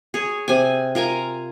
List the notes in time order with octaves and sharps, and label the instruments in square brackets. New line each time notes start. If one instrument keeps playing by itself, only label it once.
[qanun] G#4 C#5
C3 G#5
F4 A#4 G#5 A#5